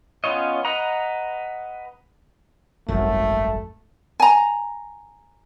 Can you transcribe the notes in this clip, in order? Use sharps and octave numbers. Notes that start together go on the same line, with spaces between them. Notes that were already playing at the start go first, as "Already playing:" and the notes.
B3 C#4 F4 C#5 D#5
B4 D#5 F#5 A#5
D#1 G#1 F#2 A3
G#5 A#5